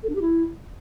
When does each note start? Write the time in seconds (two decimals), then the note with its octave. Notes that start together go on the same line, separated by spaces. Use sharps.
0.03 A4
0.09 D4
0.15 G4
0.22 E4